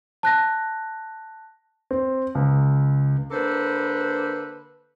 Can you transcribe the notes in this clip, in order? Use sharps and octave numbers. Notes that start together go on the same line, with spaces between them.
A5 F#6 A#6
C4
C#2
D3 A#3 A4 B4 C5